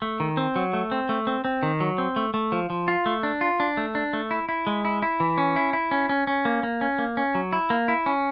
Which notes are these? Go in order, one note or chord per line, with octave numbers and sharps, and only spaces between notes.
A3
D#3
C4
F#3
A3
C4
A3
C4
C4
D#3
F#3
C4
A3
A3
F3
F3
F4
A3
D4
F4
D4
A3
D4
A3
E4
E4
G#3
E4
E4
E3
C#4
E4
E4
C#4
C#4
C#4
A#3
A#3
C#4
A#3
C#4
F#3
E4
A#3
E4
C#4